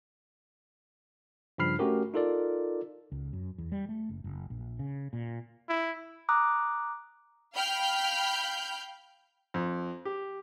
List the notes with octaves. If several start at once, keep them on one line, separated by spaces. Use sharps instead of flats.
G2 C#3 F3 B5 F6 C7
A3 C#4 F#4 G4 A#4
D#4 F4 A4 A#4 D5
C#2
F#2
E2
G3
A3
F#1
F#1
A#1
C#3
A#2
E4
A#5 D6 D#6 F#6
F5 G5 B5 F6 G6
F2
G4